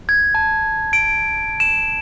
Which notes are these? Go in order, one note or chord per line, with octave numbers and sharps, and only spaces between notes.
G#6
A5
D7
E7